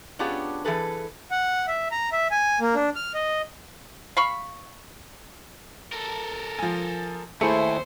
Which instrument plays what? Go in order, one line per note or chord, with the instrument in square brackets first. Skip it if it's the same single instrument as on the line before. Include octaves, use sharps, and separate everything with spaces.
[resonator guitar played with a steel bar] B3 C#4 D4 F4 G4 G#4
E3 G#4 A4 B4
[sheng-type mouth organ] F#5
E5
A#5
E5
G#5
A#3
D4
F6
D#5
[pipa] F5 B5 C#6
[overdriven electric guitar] A4 A#4
[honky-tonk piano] F3 G#5
[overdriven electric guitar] D#2 [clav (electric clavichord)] A3 E4 [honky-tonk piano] G#4 E5 C#7 [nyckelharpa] C5